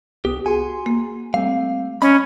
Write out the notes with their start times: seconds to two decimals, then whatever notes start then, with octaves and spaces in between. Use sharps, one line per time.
0.25 C2 B3 G4 D#6
0.46 F#4 G#4 G#5 C6
0.86 A#3
1.34 G3 A3 C4 F5
2.02 C#4 D#5 B5